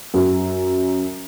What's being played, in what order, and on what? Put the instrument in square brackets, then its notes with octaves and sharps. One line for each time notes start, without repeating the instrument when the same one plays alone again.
[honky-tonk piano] F#2